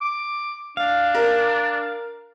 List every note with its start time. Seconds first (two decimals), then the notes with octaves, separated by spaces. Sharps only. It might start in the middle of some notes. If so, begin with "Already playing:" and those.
0.01 D6
0.77 D4 F5
1.15 A#4